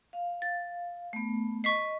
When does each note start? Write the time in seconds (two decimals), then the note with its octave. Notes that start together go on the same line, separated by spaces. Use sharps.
0.13 F5
0.42 A6
1.13 A3 B3
1.64 D#5 C#6 B6 C7